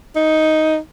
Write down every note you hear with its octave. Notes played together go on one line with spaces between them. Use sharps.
D#4